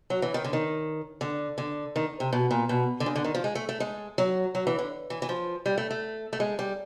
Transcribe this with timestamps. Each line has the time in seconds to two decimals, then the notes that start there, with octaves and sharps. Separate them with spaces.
0.10 F#3
0.22 E3
0.34 D#3
0.44 D3
0.53 D#3
1.21 D3
1.58 D3
1.96 D#3
2.20 C3
2.33 B2
2.51 A#2
2.69 B2
3.00 D3
3.06 C#3
3.15 D3
3.24 D#3
3.35 F3
3.44 G#3
3.55 A3
3.69 A3
3.80 G#3
4.18 F#3
4.55 F#3
4.67 E3
4.79 D3
5.10 E3
5.22 E3
5.29 F3
5.66 G3
5.78 A3
5.91 A3
6.33 A3
6.40 G#3
6.59 G3